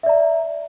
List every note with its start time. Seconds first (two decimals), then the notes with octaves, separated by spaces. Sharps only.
0.03 E5
0.06 D5
0.09 A#5